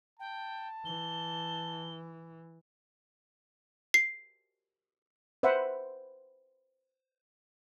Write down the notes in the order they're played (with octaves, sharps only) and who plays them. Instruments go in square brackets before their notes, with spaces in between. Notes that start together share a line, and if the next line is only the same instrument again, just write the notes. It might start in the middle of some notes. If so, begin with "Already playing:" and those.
[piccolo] G5 [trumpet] A5
[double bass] E3 [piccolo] G7
[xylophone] C7
[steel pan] B4 C5 E5 F#5